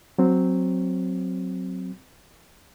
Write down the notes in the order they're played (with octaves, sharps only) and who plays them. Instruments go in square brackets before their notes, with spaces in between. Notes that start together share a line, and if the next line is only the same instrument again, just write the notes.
[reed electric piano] F#3 C4